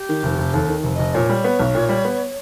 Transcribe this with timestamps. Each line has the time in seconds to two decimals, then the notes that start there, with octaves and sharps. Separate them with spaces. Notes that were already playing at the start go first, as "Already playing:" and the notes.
Already playing: G4
0.09 D#3
0.23 F1
0.38 F1
0.54 D#2 A4
0.68 D#3
0.84 F1
0.94 F1 D#5
1.14 A#2 C#5
1.29 G3
1.44 B3
1.59 B1
1.75 A#2
1.89 G3
2.05 B3